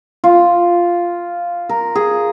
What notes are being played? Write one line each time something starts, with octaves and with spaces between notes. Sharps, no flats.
F4
A#4
G#4